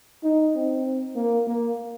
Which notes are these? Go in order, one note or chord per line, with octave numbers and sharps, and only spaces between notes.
D#4
C4
A#3
A#3